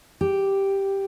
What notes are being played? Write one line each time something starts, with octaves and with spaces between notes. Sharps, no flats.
G4